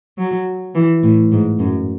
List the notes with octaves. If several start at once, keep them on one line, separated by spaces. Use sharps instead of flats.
F#3
E3
A2
G#2
F#2